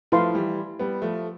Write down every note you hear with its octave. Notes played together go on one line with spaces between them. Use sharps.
F3 A3 E4 B4 F5 A5 C6
E3 G3
G3 B3
F3 A3